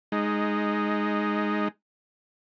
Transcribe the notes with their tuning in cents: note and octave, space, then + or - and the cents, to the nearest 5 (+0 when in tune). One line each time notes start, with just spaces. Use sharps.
G#3 +0 D#4 -5